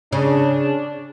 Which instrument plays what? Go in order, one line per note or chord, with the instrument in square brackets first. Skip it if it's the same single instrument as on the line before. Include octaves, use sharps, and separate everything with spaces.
[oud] C#3 [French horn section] D4